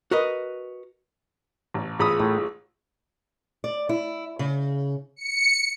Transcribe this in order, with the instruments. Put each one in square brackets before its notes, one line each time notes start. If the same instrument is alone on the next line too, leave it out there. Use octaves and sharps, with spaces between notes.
[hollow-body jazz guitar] F#4 A#4 B4 D#5
[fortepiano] A1
[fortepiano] A1 B5 D#6 [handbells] F4 G#4 E6
[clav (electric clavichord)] A2
[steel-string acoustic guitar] D5
E4
C#3
[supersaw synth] C#7